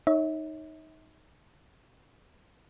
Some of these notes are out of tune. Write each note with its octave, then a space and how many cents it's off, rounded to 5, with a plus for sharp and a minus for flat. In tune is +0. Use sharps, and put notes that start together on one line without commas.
D#4 +0 C#5 +0 E5 -40